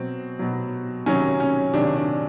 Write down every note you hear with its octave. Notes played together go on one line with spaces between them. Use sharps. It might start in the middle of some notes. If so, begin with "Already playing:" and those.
Already playing: B2 F#3 C4
B2 F#3
C3 D#3 F#3 C#4
C#4
C3 D#3 F#3 D4
D4